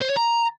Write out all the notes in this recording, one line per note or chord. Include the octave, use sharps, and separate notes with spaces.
C5
C#5
A#5